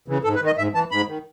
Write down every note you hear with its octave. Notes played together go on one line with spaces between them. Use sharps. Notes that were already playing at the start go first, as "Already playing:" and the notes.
C#3 E3
G#2 A4
B4
D#3
D#5
G#2 E5
E3 A5
G#2 B5
D#3